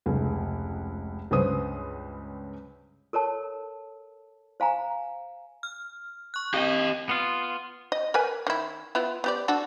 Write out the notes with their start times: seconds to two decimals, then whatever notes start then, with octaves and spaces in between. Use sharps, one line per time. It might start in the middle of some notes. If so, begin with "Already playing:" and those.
0.06 F1 C#2 G#4
1.31 C#2 G2 C#3 B4 C5 D#6
3.13 A4 A#4 C#5 A5
4.60 C5 F5 G#5 A#5
5.63 F6
6.34 C#6 F#6
6.54 C4 G4 D#5
7.09 B3 F4
7.92 D#5
8.14 A#4 B4 G#5
8.47 D#3 E4
8.95 B3 E4 F4
9.24 B3 G4 D5
9.48 D4 F#4 A4